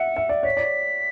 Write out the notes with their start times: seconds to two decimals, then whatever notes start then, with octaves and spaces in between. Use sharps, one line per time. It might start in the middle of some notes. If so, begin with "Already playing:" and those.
Already playing: E5 F#5 C#7
0.16 E5
0.29 D5
0.43 C#5 B6
0.57 D5